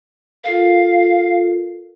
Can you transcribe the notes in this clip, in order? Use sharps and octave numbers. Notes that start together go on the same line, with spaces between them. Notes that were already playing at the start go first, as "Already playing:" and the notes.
F4 A4 A#4 F5